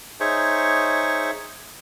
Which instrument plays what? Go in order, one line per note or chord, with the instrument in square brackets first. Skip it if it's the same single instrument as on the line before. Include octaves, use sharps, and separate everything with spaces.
[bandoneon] D#4 G#4 C5 C#5 E5 C#6